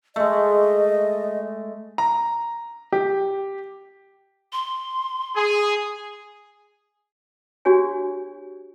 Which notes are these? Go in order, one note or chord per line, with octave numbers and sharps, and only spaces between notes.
G#3 A3 D#5
A#5
G4
C6
G#4
D4 F#4 G4 C#5 G#5